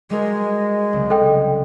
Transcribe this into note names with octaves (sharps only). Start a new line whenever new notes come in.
G3 G#3 F#4 A#4
C2 C#3 F#3
A4 D#5 G5